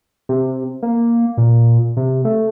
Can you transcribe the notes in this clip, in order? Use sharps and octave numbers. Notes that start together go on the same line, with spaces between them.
C3
A#3
A#2
C3
A3